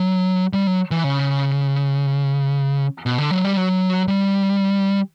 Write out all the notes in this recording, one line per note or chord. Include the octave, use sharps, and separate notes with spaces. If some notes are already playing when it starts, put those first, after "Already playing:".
Already playing: F#3
G3
F#3
E3
C#3
B2
D3
F#3
G3
F#3
G3